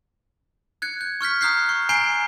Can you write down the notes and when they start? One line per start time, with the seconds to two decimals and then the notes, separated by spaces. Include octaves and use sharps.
0.82 F#6 G#6 C#7
1.01 G6
1.21 C#6 F6 G6 B6
1.41 A#5 D#6 F#6 G6 B6 C7
1.69 C#6
1.89 G#5 A#5 G6 C7 D7 G7